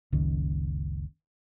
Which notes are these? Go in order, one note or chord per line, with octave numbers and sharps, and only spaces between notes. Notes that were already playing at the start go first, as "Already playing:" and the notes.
F#1 C#2 D#3